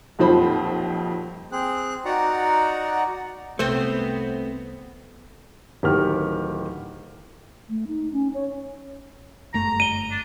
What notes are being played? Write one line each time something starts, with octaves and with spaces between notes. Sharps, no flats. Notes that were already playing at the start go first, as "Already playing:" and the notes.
D#1 B1 F2 F3 C5 B5
C4 G#4 F#6
D#4 F#4 D5 F#5 A#5
C2 A3 B3 C4 C5
D1 D#3 G4 F6
A3
D#4
C#4
C#5
G1 F#2 A3 A#5
D#7 G7
D4